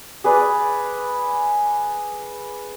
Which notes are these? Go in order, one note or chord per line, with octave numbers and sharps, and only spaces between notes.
G#4 B4 D5